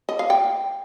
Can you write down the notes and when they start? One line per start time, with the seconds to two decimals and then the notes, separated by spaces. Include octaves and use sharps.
0.09 D#5
0.19 F5
0.30 G5